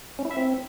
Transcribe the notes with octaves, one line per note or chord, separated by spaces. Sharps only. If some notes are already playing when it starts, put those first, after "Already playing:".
C#4
E4
E5
C4